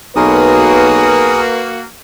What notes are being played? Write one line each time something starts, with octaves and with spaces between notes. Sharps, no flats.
B1 A#3 F#4 G#4 A#4 B4 D#6